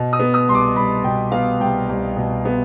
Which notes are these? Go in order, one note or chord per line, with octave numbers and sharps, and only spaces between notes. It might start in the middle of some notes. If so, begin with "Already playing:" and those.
Already playing: B2
D#6
B3
D#6
C2 C6
D6
C2 B5
B2 G5
B3 F5
C2 G5
C2
B2
B3